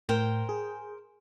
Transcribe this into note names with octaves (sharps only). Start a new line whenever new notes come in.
A2 A#4 C5 G5
G#4